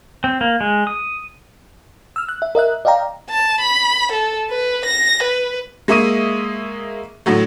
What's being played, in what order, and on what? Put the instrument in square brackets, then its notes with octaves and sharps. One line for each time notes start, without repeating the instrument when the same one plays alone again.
[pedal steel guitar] C4
A#3
G#3
D#6
[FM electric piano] E6 F6
F#6
E5
A#4 D#5 E5 F#6
D5 D#5 F5 G5 A#5
[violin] A5
B5
A4
B4
A#6
B4
[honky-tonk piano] G#3 A#3 E5 C#6 D#6 D#7
A2 D3 F#3 A3